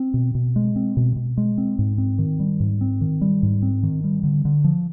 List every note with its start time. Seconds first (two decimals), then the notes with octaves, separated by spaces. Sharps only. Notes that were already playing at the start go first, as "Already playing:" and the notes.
Already playing: C4
0.14 B2
0.35 B2
0.56 G#3
0.76 C4
0.97 B2
1.16 B2
1.37 G#3
1.58 C4
1.79 G#2
1.98 C4
2.19 D#3
2.40 G3
2.60 G#2
2.81 C4
3.01 D#3
3.21 G3
3.43 G#2
3.62 C4
3.83 D#3
4.04 G3
4.23 D3
4.45 D3
4.64 F3